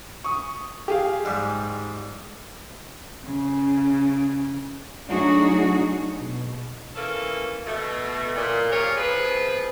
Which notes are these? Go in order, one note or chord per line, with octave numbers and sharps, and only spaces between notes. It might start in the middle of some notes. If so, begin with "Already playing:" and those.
C#6 D#6
G4 G#4 F5
G#2 G3
C#3
F#3 A3 D4 D#4 F#4 G#4
B2
E3 A#3 C#4 A4
B2 A3
A#2
F4 G4 G#4 A#4 C#5
F3 C4 G#4 B4